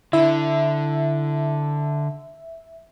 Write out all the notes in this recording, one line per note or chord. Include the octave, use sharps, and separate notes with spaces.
D3 E4 E5